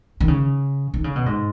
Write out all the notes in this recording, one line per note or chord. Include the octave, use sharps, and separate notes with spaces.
D#3
C#3
D#3
C#3
B2
G#2